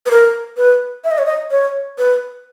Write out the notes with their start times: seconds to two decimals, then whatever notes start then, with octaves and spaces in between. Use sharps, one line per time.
0.06 B4
0.11 A#4
0.57 B4
1.04 E5
1.11 D#5
1.18 C#5
1.26 D#5
1.51 C#5
1.98 B4